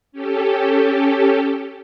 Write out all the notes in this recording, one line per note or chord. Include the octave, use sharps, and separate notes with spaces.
C#4 G4 A4